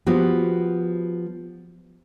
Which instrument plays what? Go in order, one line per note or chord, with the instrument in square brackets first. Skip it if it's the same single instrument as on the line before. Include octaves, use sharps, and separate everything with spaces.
[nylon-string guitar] F3 B3 F#4 G4